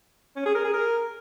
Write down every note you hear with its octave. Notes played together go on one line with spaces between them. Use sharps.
C#4
G#4
A#4
G#4
A#4